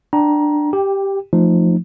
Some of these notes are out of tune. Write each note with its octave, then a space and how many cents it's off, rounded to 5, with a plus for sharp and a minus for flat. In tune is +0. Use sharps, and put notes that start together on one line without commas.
D4 +10 G5 -25 A#5 +20
G4 +0 G5 +20
F3 +0 A3 +20 D#4 -15